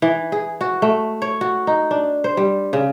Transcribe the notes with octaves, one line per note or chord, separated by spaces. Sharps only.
E3
G#4
F#4
A3
C#5
F#4
D#4
D4
C5
G3
C#3